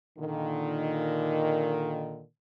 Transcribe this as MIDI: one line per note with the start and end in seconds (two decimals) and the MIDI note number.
0.19 2.23 46
0.19 2.23 50
0.19 2.23 51